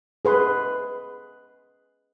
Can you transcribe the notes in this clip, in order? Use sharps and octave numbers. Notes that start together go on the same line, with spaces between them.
G#4 B4 C6